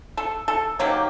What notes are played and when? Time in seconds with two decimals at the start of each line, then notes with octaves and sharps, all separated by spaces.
0.17 A4
0.48 A4
0.79 D#3 F#3 A#3 G4